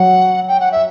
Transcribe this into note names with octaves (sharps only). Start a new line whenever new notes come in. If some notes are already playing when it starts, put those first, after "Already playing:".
Already playing: F#3 F#5
G5
F#5
E5